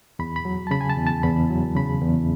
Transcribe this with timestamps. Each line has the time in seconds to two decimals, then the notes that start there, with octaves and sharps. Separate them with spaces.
0.19 E2 B5
0.36 B5
0.45 F#3
0.67 A5
0.71 C#3 B5
0.81 G#5
0.90 A5
0.97 E2
1.07 A5
1.23 E2 B5
1.50 F#3
1.76 C#3 B5
2.02 E2